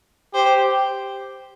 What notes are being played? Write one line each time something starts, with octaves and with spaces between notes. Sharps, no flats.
G4 C5